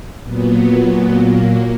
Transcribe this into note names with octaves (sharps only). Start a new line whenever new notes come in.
A#2 F#3 B3
A#3